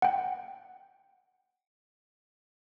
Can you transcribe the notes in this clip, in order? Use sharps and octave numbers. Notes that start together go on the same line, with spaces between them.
F#5 G5